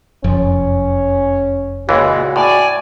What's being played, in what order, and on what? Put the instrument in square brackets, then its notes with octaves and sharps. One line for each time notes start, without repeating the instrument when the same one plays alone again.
[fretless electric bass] F1 F#2 F3 [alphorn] C#4
[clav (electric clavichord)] C#2 E3 [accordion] A#2 G#3 [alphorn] F#4
[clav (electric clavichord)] A2 [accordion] D5 G#5